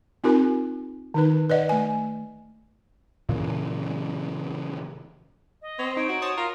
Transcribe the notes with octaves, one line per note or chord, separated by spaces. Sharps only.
C4 D#4 F4 G4 A#4 G#5
D#3 D#4 B4
B4 D5 D#5 F#5
A3 G#5
A#2 C#3 E3
D#5
C4 C#5
D#4 C#5 D7
F#4
C5 C#5 A5 D#6
F4 A#4